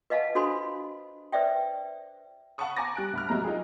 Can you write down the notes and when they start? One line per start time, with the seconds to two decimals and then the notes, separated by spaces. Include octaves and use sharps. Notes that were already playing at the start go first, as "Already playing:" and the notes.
0.10 B4 D#5 F5 F#5 A5
0.35 D4 F#4 A4 C5 B5 C6
1.32 B4 C5 D5 E5 G5
2.58 F5 F#5 A5 B5 C#6 D#6
2.76 G#5 A#5 C#6 D6 A6 A#6
2.95 G3 F#6 D7
3.13 D2 B5 F6
3.29 C2 F#3 G#3 A3 A#5
3.44 D#4 F4 G4 G#4